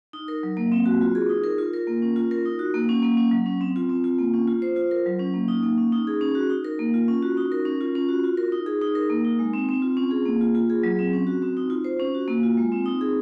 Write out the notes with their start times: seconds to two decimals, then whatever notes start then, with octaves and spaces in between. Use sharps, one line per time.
0.13 D#4
0.28 A#4
0.43 F#3
0.57 A#3
0.72 C4
0.86 F#4
1.01 F4
1.15 G#4
1.29 D#4
1.44 A#4
1.58 F4
1.73 A#4
1.87 A#3
2.02 C#4
2.16 F4
2.31 A#4
2.45 D#4
2.59 F#4
2.74 A#3
2.89 C#4
3.02 A#3
3.17 C#4
3.31 F#3
3.46 C#4
3.61 C4
3.76 F4
3.89 C4
4.04 F4
4.18 A#3
4.34 C#4
4.48 F4
4.62 C5
4.76 F4
4.91 A#4
5.06 F#3
5.19 C#4
5.34 A#3
5.48 D#4
5.63 A#3
5.77 C#4
5.92 D#4
6.07 G#4
6.21 C#4
6.35 F#4
6.50 D#4
6.65 A#4
6.79 A#3
6.94 F4
7.08 C#4
7.23 F#4
7.37 D#4
7.52 A#4
7.65 C#4
7.81 F4
7.95 C#4
8.09 F#4
8.24 F4
8.37 A#4
8.52 D#4
8.66 G#4
8.81 D#4
8.95 A#4
9.10 A#3
9.25 D#4
9.39 G#3
9.53 C4
9.69 C4
9.82 F4
9.97 C#4
10.11 G#4
10.25 A#3
10.41 F4
10.55 F4
10.70 G#4
10.84 F#3
10.99 C4
11.13 C#4
11.27 F#4
11.42 C4
11.57 D#4
11.70 F4
11.84 C5
12.00 C#4
12.15 F#4
12.28 A#3
12.43 F4
12.57 G#3
12.72 C4
12.86 D#4
13.01 G#4